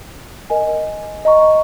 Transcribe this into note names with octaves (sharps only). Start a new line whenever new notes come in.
A#4 D#5 G#5
D#5 A#5 C#6